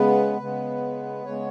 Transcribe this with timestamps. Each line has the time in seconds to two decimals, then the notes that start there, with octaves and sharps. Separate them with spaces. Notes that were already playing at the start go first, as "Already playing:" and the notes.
Already playing: C#3 G#3 B3 B4
0.39 C#3 G#3 B3
1.25 C#3 G#3 B3 C#5